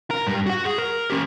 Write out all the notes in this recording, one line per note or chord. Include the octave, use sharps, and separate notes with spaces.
A#4
G2 G3
F#4 F#5
G#4
A#4
C#4 G4